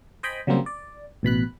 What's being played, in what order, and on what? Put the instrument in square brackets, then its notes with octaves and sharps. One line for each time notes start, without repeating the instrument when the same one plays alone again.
[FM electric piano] C5 D#5 G5 G#5 B5
C#3 F#3 G3 A#3 C4
D5
A1 B2 B5 F#6